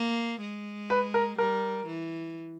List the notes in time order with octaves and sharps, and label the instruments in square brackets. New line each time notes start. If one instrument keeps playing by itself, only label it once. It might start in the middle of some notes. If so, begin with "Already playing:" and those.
Already playing: [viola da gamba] A#3
G#3
[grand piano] B4
A#4
[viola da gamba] G3 [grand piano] A#4
[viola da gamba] E3